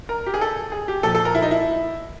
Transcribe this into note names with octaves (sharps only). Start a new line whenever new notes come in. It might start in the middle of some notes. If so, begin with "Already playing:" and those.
A#4
G4
G#4
A4
G#4
G4
A#2 F3 A4
A4
A#4
E4
D#4
E4